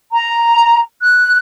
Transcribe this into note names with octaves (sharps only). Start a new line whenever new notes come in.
A#5
F#6